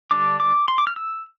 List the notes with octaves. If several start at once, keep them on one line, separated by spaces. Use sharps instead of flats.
D3 G3 D4 D6
D6
C6
D6
F6
E6